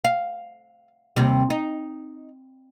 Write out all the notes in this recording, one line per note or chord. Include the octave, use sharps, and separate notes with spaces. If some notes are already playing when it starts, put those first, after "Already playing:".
F5
D#2 C3 G3
D#4